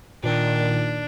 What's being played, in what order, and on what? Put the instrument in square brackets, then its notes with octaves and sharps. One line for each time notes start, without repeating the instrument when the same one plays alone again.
[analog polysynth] A#2 D#3 [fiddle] D4